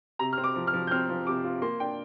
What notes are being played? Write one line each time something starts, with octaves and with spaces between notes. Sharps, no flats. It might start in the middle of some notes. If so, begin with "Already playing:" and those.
C3 A#5
C4 F6
D6
F3
F6
F3
G6
C4 F6
F3
C3 D6
F4
A#3 C6
D4 G5